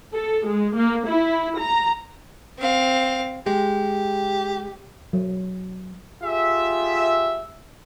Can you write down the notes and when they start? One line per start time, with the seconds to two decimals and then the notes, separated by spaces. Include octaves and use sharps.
0.14 A4
0.46 G#3
0.76 A#3
1.07 E4
1.59 A#5
2.58 C4 F5
3.46 G#3 G4
5.13 F#3
6.24 F4 G4 G#4 E5